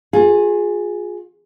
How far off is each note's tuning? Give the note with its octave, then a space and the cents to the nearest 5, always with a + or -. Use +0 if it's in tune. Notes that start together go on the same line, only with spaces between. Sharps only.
F4 +35 G#4 +0